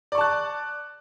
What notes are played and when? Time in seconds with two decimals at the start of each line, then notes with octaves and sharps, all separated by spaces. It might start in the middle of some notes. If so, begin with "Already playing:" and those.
0.12 D5
0.15 C#6
0.18 A5
0.21 F#6